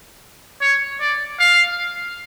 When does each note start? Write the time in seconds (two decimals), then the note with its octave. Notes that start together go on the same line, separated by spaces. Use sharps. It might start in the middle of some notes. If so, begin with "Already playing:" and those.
0.62 C#5
1.01 D5
1.40 F5